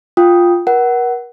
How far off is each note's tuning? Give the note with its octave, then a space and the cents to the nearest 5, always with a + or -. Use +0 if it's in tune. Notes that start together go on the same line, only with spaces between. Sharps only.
F4 +0 G5 +0 D#6 +0
A#4 +40 F#5 +20